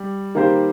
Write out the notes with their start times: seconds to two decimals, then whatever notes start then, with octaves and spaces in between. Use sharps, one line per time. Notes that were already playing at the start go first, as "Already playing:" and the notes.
Already playing: G3
0.35 D#3 A#3 G4 C5